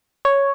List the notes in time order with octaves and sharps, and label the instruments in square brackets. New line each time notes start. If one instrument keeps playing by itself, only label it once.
[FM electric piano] C#5